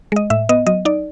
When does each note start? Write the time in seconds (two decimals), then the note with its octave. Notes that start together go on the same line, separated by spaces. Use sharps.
0.12 G#3 D#5
0.30 A2 E5
0.49 B3 D#5
0.67 F#3 D#5
0.85 D#4 D5